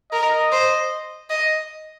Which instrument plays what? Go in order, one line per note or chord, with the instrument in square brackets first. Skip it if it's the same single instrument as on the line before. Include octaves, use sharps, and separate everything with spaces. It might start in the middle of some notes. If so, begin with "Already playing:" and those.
[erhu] A#4 [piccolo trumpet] D#5
[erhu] C5
D#5